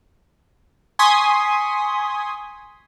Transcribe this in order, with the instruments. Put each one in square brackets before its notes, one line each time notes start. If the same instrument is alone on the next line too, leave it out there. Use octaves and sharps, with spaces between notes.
[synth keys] G#5 C6 C#6 D#6 B6